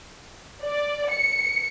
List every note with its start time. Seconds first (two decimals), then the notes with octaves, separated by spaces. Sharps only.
0.63 D5
1.11 C#7